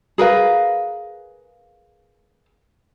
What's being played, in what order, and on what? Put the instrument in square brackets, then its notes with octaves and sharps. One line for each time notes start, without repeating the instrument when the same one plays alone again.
[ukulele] G#4 A#4 B4 F5